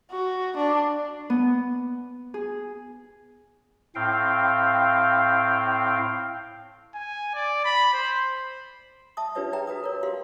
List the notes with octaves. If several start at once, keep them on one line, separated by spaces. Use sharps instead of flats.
F#4
D4
B3
G#4
A2 C4 F5 G5
G#5
D5
B5
C5
E5 A5 C#6 D#6
D4 F4 G4 B4 C#5 E5
G#4 B4 E5 G5 A#5
F#4 B4 A#5 D#6
A#4 C#5
F#4 G4 F5 C6